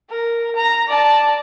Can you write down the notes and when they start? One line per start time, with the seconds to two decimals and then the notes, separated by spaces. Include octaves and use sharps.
0.11 A#4
0.56 A#5
0.88 D5 A5